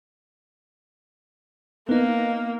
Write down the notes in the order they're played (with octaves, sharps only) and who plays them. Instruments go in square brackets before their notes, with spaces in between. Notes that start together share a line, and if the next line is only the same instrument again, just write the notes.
[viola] A#3 [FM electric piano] B3 D#4